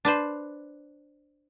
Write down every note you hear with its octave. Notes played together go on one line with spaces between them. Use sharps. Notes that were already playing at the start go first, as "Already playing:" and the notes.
D4 B4 C5